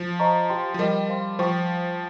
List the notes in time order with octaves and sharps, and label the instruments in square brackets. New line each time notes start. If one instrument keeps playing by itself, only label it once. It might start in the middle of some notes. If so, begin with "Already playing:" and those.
Already playing: [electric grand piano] F3
[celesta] C5 D#5 A#5 C#6
G4 C5 G5 C6
[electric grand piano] F3
[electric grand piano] G3 [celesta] A#4 D#5 G5
[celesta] C5 F5 C6
[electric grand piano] F3 [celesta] C5 G5 C#6